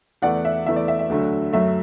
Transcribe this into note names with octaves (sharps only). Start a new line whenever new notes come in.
E2 E3 A3 D5 F#5
E5
E2 E3 A3 E5
D5
E5
E5
D2 D3 F#3 A3
F#2 F#3 A3 E5